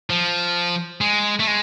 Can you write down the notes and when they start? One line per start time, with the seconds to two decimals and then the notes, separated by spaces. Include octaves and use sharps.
0.10 F3
1.01 G#3
1.40 A3
1.47 G#3